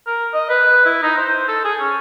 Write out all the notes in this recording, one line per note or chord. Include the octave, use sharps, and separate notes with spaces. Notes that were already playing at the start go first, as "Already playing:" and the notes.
A#4
D#5
B4
E4
D#4
C5
A4
G#4
C#4